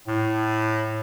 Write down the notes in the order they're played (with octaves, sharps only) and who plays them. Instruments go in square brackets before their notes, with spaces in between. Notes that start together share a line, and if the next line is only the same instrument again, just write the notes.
[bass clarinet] A2